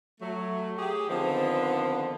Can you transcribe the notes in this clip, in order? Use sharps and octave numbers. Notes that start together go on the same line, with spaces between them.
F#3 A3
G4 G#4
D3 D#3 F3 B3 C4